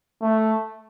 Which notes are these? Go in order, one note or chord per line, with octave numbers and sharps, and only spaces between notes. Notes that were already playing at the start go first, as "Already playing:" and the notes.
A3